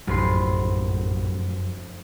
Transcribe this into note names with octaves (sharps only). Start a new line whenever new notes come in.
F1 A#1 F#2 A2 B4 C6